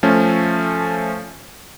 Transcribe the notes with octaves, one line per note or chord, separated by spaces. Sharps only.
F3 A3 C#4